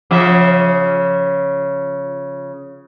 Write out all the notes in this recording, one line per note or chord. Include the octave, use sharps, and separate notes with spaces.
C#3 F3 E5